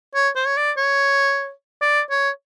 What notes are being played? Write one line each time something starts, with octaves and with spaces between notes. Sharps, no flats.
C#5
C5
C#5
D5
C#5
D5
C#5